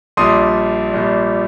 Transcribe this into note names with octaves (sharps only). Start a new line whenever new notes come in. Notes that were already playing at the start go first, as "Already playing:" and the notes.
A#1 A#2 G3 C6 D#6
A#1 A#2 G3